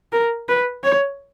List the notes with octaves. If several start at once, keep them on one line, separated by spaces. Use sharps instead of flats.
A#4
B4
C#5